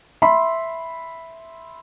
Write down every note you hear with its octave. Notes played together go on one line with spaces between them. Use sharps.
E5 B5 C6